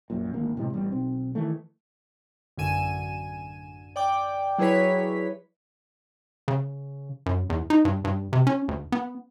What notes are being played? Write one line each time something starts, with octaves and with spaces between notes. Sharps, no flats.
A#1 F#2 A#2
G#1 D2 A#3
A2 C3 G#3 C4
A1 G3 B3
B1 C4
D#3 E3 A3
A1 F#2 D3 G#5 D#7 E7
D5 G5 D6
F#3 E4 G#4 B4 C#5 B6
C#3
F#2
E2
D#4
G2
G2
C3
C#4
D2
B3